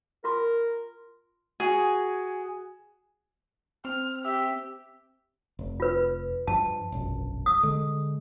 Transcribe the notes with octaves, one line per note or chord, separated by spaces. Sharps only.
F4 A#4 C6
F#4 G#4 G#5
C4 F6
G4 E5
F1
F4 B4
G2 F3 A5
E1 A#1 F#2
D#6
D3 G#3